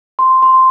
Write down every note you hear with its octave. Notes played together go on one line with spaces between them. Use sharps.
C6
C6